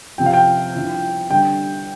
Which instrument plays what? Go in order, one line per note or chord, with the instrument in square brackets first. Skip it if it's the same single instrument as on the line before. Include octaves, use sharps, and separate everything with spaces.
[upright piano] C3 F3 C4 [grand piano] G5
[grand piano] F5
G5
[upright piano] G2 F3 C4 E4
[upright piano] G2 D3 G3 D4 [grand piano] G5